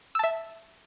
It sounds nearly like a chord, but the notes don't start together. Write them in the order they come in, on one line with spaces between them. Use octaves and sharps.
E6 A5 E5